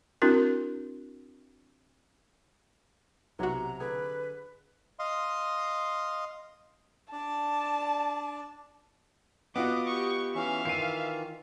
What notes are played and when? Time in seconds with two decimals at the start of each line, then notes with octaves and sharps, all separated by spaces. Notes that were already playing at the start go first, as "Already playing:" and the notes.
0.22 C4 D4 E4 F#4 A#4
3.39 B1 C3 F#3 F#4 A#5
3.80 D3 G#4 B4
4.99 D#5 F5 C6
7.12 D4 D5 A5
9.56 B3 F4 F#4 D#5 F#5 D6
9.87 G4 C#6
10.35 E3 C#4 E5 F5 C#6
10.65 D#3 E3 F4 C7 D#7